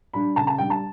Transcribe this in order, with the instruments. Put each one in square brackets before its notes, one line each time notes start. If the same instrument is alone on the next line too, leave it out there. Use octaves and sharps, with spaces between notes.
[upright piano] G3 D4 B5
C#3 A5
A5
G3 D4 G5
A5